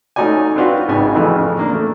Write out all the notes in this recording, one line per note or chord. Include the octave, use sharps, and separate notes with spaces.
A3 C#4 D#4 F#4 D5 G#5
C4 D4 F4 F#4 B4
G#1 G#2 C#3 B3 G#5
F2 A2 C#3 E3 F3
A#3 D4
A3